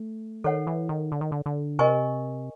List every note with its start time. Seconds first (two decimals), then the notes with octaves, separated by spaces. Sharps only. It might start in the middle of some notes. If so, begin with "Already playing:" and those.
Already playing: A3
0.44 D#3 A4 C#5 F#5
0.67 E3
0.89 D#3
1.12 D3
1.21 D#3
1.32 D3
1.46 D3
1.79 C3 A#4 D#5 G#5 C#6